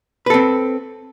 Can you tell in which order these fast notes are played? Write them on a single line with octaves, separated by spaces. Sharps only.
B4 A4 C4